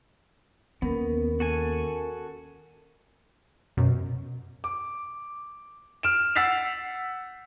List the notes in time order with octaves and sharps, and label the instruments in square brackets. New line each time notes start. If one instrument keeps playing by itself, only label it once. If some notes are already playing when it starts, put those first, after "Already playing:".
[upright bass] D#2 [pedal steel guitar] B3 [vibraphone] C#4 A#4
[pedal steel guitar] F#4 A4 G#5
[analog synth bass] F#2 [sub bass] B2
[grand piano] D6
F6 D7 E7
F#5 E6 A6 B6 C7 F7